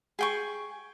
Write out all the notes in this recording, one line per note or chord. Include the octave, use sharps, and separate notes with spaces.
G#4 G5 C#6